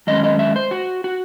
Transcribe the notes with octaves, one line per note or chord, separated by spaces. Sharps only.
F#2 D#3 G#3 C#4 D#5
D#5
E5
C5
F#4
F#4